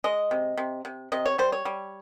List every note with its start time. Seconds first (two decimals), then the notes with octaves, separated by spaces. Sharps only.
0.04 G#3 D#5
0.31 C3
0.57 C3
0.85 C3
1.12 C3 D#5
1.26 C#5
1.38 G3 C5
1.52 C#5
1.65 G3